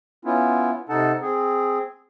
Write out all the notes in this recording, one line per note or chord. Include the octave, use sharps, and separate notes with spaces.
B3 C#4 E4 F4
C3 D#4 A4 F#5 A5
C4 G#4